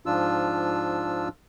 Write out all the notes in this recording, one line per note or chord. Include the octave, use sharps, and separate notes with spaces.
G#2 F3 D4 F4 E6